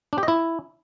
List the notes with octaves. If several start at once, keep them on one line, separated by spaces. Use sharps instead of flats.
D4
G4
D#5
E4